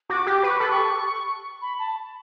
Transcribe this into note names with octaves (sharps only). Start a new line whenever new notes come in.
F#4 D6
G4
D6
B4 C#6
A4 B5
G4 C#6
A4
B5
A5